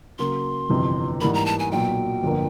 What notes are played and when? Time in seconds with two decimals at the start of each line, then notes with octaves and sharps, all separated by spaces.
0.19 C#3 F#3 A#3 C6
0.69 G1 F2 C3 E3
1.21 G#2 E3 G3 A#3 B5
1.34 A#5
1.46 A5
1.59 G#5
1.72 B1 A#2 F#3 G5
2.23 G1 F2 D3 F#3 A#3